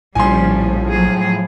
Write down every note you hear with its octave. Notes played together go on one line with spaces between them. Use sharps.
A#1 A2 C#3 F3 G3 G#5 C6
F#3 G#4